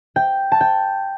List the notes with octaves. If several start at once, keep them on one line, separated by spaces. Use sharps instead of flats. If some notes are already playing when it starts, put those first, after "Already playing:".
G5
A5
G5